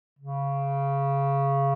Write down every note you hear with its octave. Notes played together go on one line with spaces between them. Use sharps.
C#3